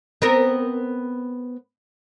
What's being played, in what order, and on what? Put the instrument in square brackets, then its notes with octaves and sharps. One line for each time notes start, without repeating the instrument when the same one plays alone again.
[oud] B3 C4 A#4